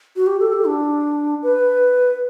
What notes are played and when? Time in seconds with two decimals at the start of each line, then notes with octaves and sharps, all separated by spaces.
0.16 F#4
0.27 G4
0.40 A4
0.53 G4
0.65 D4
1.43 B4